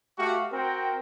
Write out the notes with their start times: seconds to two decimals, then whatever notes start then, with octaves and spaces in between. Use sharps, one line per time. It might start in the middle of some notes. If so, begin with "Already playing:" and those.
0.17 A3 F#4 G4 F5 C#6
0.51 C4 F#4 A#4 G5